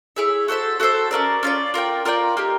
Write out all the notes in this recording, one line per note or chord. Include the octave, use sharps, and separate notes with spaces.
E4 G#4 C#5 E5
F#4 A4 C5 E5
F#4 A4 C5 E5
C#4 F4 A#4 D5
C#4 F4 A#4 D5
F4 A#4 D5 G5
F4 A#4 D5 G5
A#3 D#4 G4